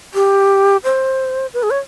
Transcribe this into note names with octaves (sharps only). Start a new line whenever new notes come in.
G4
C5
B4
G#4
C#5